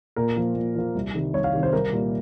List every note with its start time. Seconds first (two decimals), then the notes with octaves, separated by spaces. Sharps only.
0.16 A#2 A#4
0.36 F3 A#3
0.55 A#2
0.76 F3 A#3
0.95 C2
1.14 C3 D#3 G3
1.34 C2 C#5
1.44 F5
1.53 C3 D#3 G3
1.63 C5
1.73 C2 A#4
1.93 A#2 G3 A#3